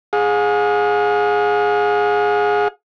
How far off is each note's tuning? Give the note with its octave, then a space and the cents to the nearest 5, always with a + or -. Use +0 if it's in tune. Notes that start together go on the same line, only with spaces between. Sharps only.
G#4 +0 F5 +45